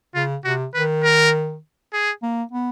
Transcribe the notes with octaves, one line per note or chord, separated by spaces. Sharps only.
C#3 F4
C3 F#4
D#3 B4
A#4
G#4
A#3
B3